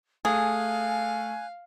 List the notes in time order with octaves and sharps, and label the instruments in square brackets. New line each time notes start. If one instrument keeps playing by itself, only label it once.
[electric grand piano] A3 [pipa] G#4 [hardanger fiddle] F5 [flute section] G#5 F#6